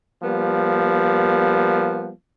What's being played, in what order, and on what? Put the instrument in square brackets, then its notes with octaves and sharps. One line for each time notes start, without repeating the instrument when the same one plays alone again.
[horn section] F3 G3 A#3 B3